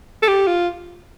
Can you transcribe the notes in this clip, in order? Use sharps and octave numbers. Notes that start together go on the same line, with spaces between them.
A4
G4
F4